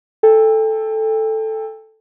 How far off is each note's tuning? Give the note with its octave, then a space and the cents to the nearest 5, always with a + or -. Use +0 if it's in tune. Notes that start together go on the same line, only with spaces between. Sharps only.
A4 +0 G5 +35